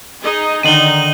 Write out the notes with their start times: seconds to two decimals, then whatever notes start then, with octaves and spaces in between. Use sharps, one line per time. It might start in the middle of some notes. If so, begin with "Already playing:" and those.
0.25 D#4 G#4 D#5
0.63 D3 D#3 D#4 D#7 F#7 G7